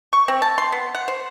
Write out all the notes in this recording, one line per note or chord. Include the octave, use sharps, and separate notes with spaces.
C#6
C4
A5
C6
B3
F#5
C5